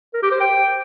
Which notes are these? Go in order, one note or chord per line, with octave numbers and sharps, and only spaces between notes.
A#4
G4
C5
G5